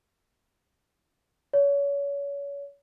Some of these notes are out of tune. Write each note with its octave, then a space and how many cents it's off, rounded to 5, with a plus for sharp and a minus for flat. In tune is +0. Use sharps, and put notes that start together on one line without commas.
C#5 +30